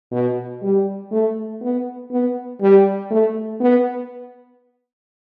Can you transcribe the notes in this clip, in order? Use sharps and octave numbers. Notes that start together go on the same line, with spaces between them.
B2
G3
A3
B3
B3
G3
A3
B3